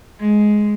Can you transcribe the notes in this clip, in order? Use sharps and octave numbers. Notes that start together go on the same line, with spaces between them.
G#3